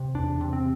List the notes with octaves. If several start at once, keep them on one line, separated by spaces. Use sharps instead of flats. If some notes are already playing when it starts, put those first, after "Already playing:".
Already playing: C3
E2 D4
C3
C4